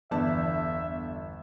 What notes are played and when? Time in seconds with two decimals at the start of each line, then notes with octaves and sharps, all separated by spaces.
0.11 G1 E2 B3 D5 E5 A5